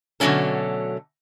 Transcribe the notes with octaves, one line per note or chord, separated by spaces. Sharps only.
B2 D3 F#3 A3 C#4 A4